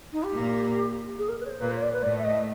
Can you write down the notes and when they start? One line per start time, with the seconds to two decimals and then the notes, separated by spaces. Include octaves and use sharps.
0.13 D#4
0.23 G4
0.34 A#2 A#3
1.19 G#4
1.29 A#4
1.40 B4
1.45 C#5
1.50 C5
1.61 A#2 A#3 B4
1.71 C5
1.76 C#5
1.82 D5
1.93 B4
2.03 A2 A3 D5
2.19 E5
2.24 D#5